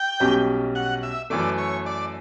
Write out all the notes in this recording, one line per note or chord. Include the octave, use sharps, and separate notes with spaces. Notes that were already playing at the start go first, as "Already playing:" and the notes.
Already playing: G5
B1 B2 G3 C#4 G4
F#5
E5
F#2 E3 A3 D5
C#5
D5